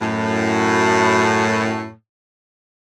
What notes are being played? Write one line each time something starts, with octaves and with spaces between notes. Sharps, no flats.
F#2 A2